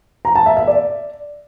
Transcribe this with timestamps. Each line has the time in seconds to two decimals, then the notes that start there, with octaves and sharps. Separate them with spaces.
0.25 A#5
0.35 A5
0.46 E5
0.57 E5
0.68 D5